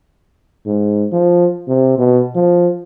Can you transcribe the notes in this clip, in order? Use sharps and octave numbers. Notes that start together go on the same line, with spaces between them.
G#2
F3
C3
B2
F3